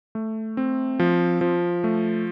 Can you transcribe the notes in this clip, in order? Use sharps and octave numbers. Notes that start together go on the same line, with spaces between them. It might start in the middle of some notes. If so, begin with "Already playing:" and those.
A3
C4
F3
F3
A3